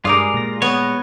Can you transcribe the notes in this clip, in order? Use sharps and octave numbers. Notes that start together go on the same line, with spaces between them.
G2 G3 G#3 F4 A#4 D5 D#6
A#2 A#6
B3 C#5